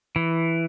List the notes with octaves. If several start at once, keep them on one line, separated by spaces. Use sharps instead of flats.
E3